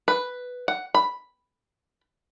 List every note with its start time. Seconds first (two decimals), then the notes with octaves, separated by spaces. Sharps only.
0.08 B4
0.68 F#5
0.94 B5